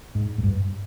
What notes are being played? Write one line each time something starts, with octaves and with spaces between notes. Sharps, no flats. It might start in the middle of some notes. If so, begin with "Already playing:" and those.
G#2
G#2
G2